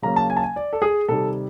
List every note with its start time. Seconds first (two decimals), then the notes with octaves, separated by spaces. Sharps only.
0.02 C#3 F#3 A#3 C#4 A#5
0.16 A5
0.30 G#5
0.37 A5
0.43 G#5
0.56 D5
0.73 A4
0.82 G#4
1.08 C3 D#3 G3 A4